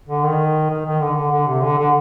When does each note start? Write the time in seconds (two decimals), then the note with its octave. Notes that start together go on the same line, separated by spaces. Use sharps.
0.09 D3
0.24 D#3
0.70 D#3
0.86 D#3
1.01 D3
1.16 D3
1.32 D3
1.47 C3
1.63 D3
1.78 D3